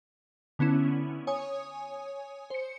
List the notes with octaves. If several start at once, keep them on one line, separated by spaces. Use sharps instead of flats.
D3 B3 C#4 E4
C#5 G#5 D#6
C5 C#7